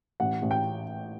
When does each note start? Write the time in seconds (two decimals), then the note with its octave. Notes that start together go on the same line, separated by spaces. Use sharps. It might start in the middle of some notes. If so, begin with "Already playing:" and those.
0.20 A1 F#5
0.42 A1
0.51 G5